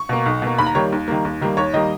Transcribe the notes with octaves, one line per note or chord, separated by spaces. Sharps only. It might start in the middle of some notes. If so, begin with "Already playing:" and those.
Already playing: C#6
B2 A#3
B1
B2 A#3
D#2 B5
A#5
D#3 G3 A#3 C#5
D#2
D#3 G3 A#3
D#2
D#3 G3 A#3
D#2 C#5
D#3 G3 A#3 D#5